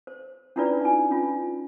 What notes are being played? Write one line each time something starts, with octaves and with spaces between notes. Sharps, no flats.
C5
C#4 D4 E4 F4 B4 D5
D#4 G#5
C#4 F4